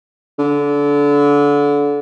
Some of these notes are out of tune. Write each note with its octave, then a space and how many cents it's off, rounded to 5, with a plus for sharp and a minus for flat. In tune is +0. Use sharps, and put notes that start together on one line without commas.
D3 -25